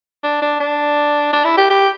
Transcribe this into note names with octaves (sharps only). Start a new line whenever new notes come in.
D4
D4
D4
D4
E4
G4
G4